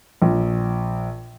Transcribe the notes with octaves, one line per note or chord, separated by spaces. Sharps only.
A#1